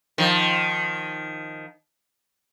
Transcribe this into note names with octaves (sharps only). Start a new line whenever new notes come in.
D#3 F3